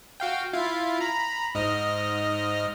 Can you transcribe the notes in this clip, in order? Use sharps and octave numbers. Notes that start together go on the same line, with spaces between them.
F#4 F5 G5
E4 F4 F5
A#5 B5
G#2 D#5 F6